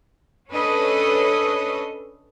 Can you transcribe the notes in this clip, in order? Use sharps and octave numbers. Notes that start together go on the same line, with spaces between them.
C#4 D4 A4 B4 C#5 D#5